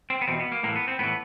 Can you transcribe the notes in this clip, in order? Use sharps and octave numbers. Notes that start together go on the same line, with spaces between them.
C4
B3
E2 B2 C4
B3
A#3
A2 E3 A#3
B3
C4
A2 E3 B3